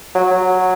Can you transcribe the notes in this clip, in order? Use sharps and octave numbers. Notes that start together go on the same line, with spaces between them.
F#3
F#3